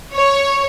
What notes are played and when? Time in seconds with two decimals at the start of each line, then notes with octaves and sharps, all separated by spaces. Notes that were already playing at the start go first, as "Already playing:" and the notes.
0.14 C#5